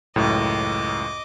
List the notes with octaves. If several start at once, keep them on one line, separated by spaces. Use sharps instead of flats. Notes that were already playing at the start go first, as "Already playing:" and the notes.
C#2 F#2 A2 D#5 D6